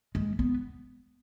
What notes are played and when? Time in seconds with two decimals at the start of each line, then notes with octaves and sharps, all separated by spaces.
0.15 G#3
0.39 B3